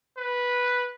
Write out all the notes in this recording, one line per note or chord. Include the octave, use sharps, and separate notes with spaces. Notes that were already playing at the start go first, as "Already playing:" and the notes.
B4